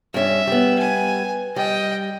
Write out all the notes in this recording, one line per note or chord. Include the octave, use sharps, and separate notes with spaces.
G2 C#4 E5
G3 B3
G#5
G3 D#5 G5